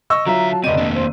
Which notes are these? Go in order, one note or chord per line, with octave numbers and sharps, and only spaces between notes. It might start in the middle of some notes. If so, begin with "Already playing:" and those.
D#5 C#6 E6
D3 F#3 F4 E5 A#5
A5
F1 C#3 C4 D5 D#5 D#7
D#3 A#3 D4
C5